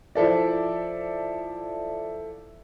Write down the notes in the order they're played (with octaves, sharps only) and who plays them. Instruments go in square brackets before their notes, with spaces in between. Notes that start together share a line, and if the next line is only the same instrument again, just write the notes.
[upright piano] F3 E4 A4 D5